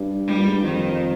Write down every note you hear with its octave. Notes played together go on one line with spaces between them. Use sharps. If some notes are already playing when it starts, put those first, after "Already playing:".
Already playing: G2
G3
A#2
G#2
G2
F2 D#3